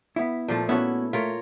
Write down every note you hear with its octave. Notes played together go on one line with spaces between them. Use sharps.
B3 E4
A#2 F3 A3
B3 C#4 E4 F#4
A3 F4 A#4 C#5